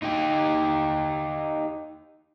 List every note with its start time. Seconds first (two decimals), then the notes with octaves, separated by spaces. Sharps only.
0.02 D#4 G4